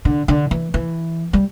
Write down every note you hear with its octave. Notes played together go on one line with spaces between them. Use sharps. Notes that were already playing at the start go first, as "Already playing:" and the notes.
D3
D3
E3
E3
G3